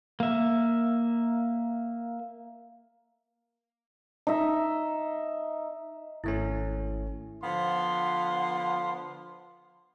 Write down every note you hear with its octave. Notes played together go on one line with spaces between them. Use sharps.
A#3 E5
D#4 E5
G#1 A3 C#4 E4
D3 F3 B3 F5 C6